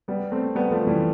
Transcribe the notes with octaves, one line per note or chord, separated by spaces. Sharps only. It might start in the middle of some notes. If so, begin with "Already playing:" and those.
G3 B3
A3 C4
G3 B3
F3 A3
E3 G3